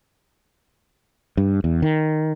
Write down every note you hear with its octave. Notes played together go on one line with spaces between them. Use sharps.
G2
E2
D#3